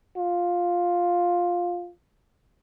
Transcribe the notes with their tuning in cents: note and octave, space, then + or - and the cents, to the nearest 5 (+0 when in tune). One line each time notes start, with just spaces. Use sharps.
F4 +10